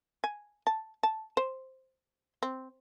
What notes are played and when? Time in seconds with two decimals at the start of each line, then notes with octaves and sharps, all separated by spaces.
0.24 G#5
0.67 A5
1.03 A5
1.37 C5
2.43 C4